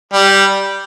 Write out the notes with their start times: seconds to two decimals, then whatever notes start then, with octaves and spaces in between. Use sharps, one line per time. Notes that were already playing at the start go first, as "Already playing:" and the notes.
0.14 G3